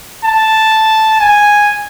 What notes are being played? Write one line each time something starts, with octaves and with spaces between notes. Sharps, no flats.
A5
G#5